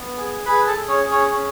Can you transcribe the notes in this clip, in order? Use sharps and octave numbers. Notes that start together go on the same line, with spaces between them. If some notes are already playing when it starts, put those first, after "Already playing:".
Already playing: B3
G#4
G#4 B4 B5
A4 A5
G#4
C#4 C#5
G#4
C#4 C#5
C#4